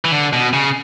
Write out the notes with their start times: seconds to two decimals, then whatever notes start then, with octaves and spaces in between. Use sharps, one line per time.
0.05 E3
0.11 D3
0.33 B2
0.53 C#3